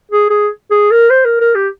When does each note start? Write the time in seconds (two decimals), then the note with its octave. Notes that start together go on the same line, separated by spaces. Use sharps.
0.11 G#4
0.30 G#4
0.71 G#4
0.91 A#4
1.10 C5
1.25 A#4
1.41 A#4
1.55 G4